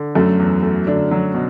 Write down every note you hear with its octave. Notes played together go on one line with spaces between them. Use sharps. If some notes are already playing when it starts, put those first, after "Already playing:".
Already playing: D3
F#2 F#3 A3
E2
A3
D3 A3 D4
F#3
B2